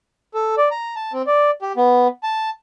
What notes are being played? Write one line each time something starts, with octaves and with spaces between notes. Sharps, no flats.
A4
D5
A#5
A5
C4
D5
G4
B3
A5